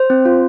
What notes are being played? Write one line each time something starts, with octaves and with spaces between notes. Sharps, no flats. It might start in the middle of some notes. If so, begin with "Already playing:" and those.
Already playing: C5
C4
F4